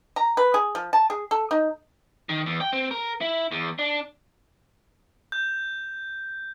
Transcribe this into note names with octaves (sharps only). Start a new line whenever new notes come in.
A#5
B4
G#4
F3
A5
G#4
A4
D#4
D#3
E2
G5
C4
A#4
E4
E2
D4
G6